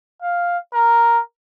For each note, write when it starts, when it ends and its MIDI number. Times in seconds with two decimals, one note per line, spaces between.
0.22 0.57 77
0.74 1.20 70